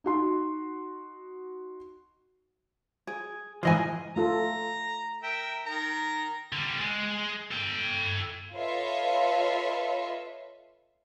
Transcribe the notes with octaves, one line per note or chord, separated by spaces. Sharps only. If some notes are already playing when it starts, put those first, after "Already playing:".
D#4 F#4 C6
G#4
G#2 E3 F3 G#4 D#5 G#5
A3 F4 A4 A#5
A#4 E5 G5
D#3 A#4 A#5
D3 G3
G#3
A4 G5
F4 A4 B4 C#5 D#5 E5